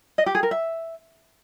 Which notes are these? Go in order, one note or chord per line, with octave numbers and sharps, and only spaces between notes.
D#5
G4
G#4
A#4
E5